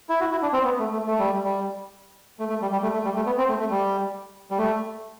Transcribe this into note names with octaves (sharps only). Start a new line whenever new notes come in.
E4
F#4
E4
D4
C4
B3
A3
A3
A3
G3
G3
A3
A3
G3
G3
A3
A3
G3
A3
B3
C4
A3
A3
G3
G3
A3